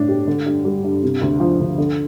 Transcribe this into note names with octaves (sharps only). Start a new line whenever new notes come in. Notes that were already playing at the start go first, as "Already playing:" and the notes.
Already playing: A2 D4
G4
D3
G2
G3
G2
C3
D2
F3
D2
D3